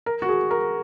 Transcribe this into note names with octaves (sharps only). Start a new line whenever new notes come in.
A#4
F#4
G#4
A#4